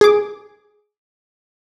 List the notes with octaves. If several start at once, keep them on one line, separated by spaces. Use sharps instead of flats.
G#4 D6